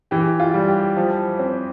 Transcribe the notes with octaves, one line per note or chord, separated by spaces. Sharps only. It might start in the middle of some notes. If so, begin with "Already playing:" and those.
E3 G4
F4
G3
G4
F3
C4